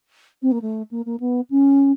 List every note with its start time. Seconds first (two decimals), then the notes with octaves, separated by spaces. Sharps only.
0.42 C4
0.51 A#3
0.62 A3
0.91 A#3
1.05 A#3
1.20 B3
1.50 C#4